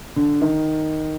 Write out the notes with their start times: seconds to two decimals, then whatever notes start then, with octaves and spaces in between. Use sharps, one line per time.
0.16 D3
0.41 D#3